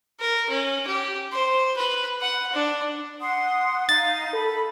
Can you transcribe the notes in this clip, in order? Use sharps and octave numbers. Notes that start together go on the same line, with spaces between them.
A#4
C#4
G4
C5
B4
F#5
D4
F#5 C6 D#6
D#4 F5 A6
A4 B5